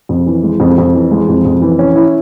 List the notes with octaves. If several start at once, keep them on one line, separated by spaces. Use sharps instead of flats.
F2
E3
G#3
F2
F2
E3
G#3
F2
F2
E3
C#4
E4